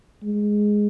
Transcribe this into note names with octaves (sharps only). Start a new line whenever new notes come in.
G#3